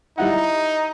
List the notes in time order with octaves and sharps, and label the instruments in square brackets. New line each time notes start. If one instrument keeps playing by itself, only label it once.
[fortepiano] G3 E4 F#5 [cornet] D#4